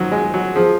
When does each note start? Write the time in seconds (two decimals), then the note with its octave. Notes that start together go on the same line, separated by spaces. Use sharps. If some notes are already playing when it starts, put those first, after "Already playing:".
Already playing: D#3 F3 F#3
0.12 G#3
0.34 F#3
0.55 F3 G#4